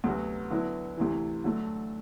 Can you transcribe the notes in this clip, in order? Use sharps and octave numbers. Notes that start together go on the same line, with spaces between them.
D2 C3 F#3 B3 F#4
D3 F#3 B3 E4
D2 C3 E3
D3 F#3 A3